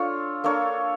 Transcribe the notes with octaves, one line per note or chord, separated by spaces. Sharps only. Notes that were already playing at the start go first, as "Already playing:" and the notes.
Already playing: D4 F4 A4 C#5
A#3 D4 A4 C#5